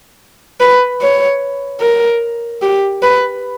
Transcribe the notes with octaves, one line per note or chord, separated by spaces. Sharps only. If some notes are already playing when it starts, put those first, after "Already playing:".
B4
C#5
A#4
G4
B4